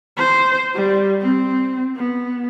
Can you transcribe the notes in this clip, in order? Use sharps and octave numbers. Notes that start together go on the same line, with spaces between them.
C5
G3
C4
B3